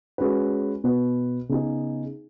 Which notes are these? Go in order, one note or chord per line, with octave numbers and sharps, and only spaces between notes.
G#3 C#4 F#4 B4
B2 B3 F#4 B4
C#3 B3 D#4 G#4